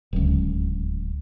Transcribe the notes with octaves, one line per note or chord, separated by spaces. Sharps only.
D1 C#2